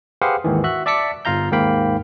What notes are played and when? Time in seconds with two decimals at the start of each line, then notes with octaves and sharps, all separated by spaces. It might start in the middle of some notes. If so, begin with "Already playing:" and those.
0.22 G4 G#4 B4 C5 F5 F#5
0.44 D#2 G#2 D#3 E3
0.64 F#4 E5 F#6
0.86 D5 E5 A5 D6 B6 C#7
1.25 G1 F4 F5 A#5 G6
1.52 D#2 G#2 A#3 F5 G5 B5